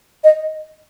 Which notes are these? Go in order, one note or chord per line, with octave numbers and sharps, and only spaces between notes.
D#5